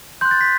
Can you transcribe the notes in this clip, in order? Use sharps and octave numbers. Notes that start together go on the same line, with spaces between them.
C6 F#6 G6
A6
B6